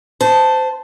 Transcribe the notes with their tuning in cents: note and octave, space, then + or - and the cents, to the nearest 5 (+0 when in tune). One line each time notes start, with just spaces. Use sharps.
C5 -20 A5 +0